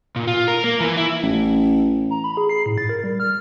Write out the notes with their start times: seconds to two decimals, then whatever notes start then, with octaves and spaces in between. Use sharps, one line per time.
0.16 A#2
0.27 F4
0.48 A#4
0.64 A#3
0.80 E3
0.97 E4
1.23 A1
2.11 A#5
2.24 B5
2.37 G#4
2.49 C7
2.66 A2
2.78 A6
2.89 A#4
3.04 G3
3.20 F6